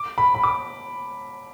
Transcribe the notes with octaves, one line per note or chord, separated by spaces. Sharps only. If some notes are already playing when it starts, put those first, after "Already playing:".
Already playing: D6
B5
B5
D6